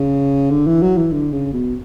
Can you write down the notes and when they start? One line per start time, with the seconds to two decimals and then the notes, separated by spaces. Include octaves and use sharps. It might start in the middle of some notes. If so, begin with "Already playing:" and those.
Already playing: C#3
0.51 D3
0.67 E3
0.82 F#3
0.97 E3
1.12 D3
1.32 C#3
1.53 B2